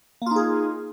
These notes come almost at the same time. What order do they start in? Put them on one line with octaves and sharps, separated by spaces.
A#3 F4 D#4 G#4